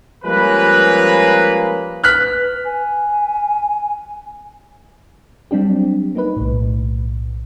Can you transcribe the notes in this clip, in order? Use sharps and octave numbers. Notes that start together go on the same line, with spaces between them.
F3 G3 G#3 A#3 C#4 B4
B4 F6 F#6 B6
G#5
F#3 G3 C4 D4 G4
A#3 D#4 B4
B1 A2